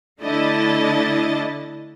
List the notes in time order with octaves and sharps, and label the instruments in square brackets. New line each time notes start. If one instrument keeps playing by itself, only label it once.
[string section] D3 A3 D4 E4 D#5 A6